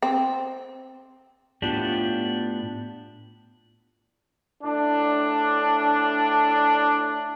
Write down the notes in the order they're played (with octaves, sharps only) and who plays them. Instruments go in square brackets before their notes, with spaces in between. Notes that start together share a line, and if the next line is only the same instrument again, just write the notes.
[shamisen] C4
[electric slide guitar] A2 B3 D4 F4 G4
[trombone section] A2 D4